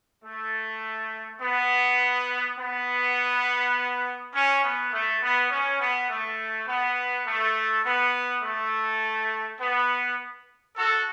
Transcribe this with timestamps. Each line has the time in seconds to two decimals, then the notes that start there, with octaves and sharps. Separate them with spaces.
0.24 A3
1.41 B3
2.58 B3
4.33 C#4
4.63 B3
4.92 A3
5.22 B3
5.50 C#4
5.80 B3
6.09 A3
6.67 B3
7.26 A3
7.84 B3
8.43 A3
9.60 B3
10.76 F#4 A4